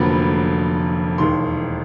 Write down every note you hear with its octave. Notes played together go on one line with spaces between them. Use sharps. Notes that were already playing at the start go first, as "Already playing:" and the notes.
Already playing: F1 F2 D3 F#3 A#3 B5
E1 D#2 D#3 C6